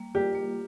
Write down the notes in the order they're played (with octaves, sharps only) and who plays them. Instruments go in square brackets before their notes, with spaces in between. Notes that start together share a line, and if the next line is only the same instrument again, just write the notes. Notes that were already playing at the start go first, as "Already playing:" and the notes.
Already playing: [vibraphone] G3 A#3
[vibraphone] F4 [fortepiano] G4
[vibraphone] A#3